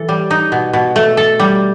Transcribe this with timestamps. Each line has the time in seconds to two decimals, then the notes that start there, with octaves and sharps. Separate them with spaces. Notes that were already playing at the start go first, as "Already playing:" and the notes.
Already playing: E3 A4
0.09 G3
0.31 D#4
0.52 B2
0.73 B2
0.96 A3
1.17 A4
1.40 G3